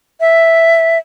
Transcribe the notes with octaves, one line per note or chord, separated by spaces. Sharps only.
E5